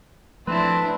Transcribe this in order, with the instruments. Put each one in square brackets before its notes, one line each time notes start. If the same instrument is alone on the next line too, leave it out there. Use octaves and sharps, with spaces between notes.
[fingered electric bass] F3 A3 [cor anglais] C4 [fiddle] D4 E4 [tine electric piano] B4 A5